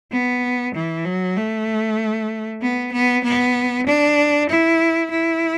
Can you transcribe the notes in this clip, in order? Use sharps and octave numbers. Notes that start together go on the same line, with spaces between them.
B3
E3
F#3
A3
B3
B3
B3
D4
E4
E4